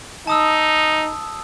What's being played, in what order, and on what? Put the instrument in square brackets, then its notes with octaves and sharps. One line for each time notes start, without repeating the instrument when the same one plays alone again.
[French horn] D#4 [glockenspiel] A5 D#6 E6